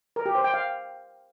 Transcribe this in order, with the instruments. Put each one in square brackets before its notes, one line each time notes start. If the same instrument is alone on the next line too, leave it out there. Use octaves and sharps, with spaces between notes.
[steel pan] A#4
G4
C5
G5
F5